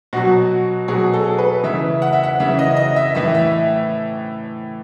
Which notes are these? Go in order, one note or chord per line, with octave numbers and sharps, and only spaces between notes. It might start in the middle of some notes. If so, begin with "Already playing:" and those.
B2 F#3 F#4
B2 F#3 G#4
A4
B4
C#3 E3 E5
F#5
E5
F#5
C#3 E3 E5
D#5
D#5
E5
A2 E3 E5
E5